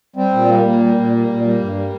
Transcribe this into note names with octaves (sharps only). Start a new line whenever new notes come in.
G3 C4
A#2
G3 A#3
A#2 A#3
G3
A#2
G3
A#2
G3
G2
G3